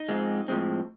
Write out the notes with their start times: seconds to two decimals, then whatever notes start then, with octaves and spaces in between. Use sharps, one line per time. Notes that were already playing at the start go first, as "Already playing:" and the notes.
Already playing: D#4
0.08 G#2 F3 G#3 C4
0.48 A2 F3 G#3 C4